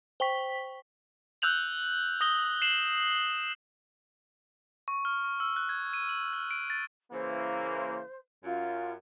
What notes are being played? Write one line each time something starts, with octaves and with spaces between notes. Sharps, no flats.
C5 G5 C#6 B6
E6 F#6 G6 F7 F#7
D#6 A#6 F7 G7
C7 E7 F#7
C#6
F6
C#6
E6
F#6
G#6
D#7
F#7
F6
D7
A6
C#3 E3 A#3 C5
F#2 F4